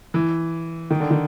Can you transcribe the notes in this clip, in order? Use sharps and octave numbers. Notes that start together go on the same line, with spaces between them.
E3
D#3
D3
D#3